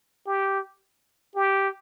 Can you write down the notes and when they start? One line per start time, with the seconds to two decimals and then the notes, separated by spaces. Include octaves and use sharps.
0.27 G4
1.36 G4